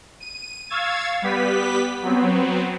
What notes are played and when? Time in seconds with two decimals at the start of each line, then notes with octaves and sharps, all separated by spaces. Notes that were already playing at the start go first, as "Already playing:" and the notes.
0.20 D#7
0.70 F5 C#6 E6 G#6 A6
1.22 G3 B3 G4 B4 B6
2.03 F#3 B3 C4